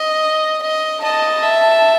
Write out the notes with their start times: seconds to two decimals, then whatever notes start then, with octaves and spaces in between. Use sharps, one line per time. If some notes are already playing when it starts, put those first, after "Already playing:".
Already playing: D#5
0.62 D#5
1.04 D#5 A5
1.43 E5